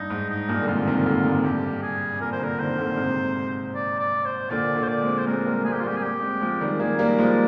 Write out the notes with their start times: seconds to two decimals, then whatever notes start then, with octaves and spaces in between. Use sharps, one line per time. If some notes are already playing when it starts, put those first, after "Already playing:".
Already playing: G2 D#4
0.10 G#2
0.30 D#4
0.49 G2 A#2
0.62 D3
0.68 G#2 C3 F4
0.87 C3 D#3
1.06 A#2 D3
1.25 G#2 C3
1.44 G2 G4
1.82 G#4
2.13 C3
2.21 A#2 D3 A#4
2.32 C5
2.40 A#2 D3 A#4
2.59 C3 D#3 C5
2.78 A#2 D3
2.97 G#2 C3
3.74 D5
4.00 D5
4.25 C5
4.50 A#2 D3 D5
4.76 A#2 D3
4.83 C5
4.88 D5
5.02 G#3 C4
5.18 C5
5.26 G#3 C4 A#4
5.46 G3 A#3
5.65 G#3 C4 G#4
5.73 G4
5.80 F4
5.84 G3 A#3 G4
5.97 G#4
6.03 G4
6.22 G#3 C4
6.41 F3 G#3
6.61 D#3 G3
6.80 G3 A#3 G#4
6.99 G3 A#3
7.05 A#4
7.19 F3 G#3
7.31 D5